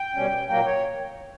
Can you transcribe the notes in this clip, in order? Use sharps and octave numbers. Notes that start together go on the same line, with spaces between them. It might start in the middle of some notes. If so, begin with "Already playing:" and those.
Already playing: G5
B2 G3 C#4
A#2 F#3 A#3 G5
C#5